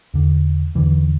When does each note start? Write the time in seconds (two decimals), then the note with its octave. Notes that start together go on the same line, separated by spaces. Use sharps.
0.14 E2 D3
0.75 E2 D3 E3